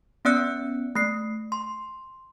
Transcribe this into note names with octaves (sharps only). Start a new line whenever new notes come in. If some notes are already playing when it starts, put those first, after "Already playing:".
B3 C#4 D5 E6 F#6 C#7
A3 C7
C6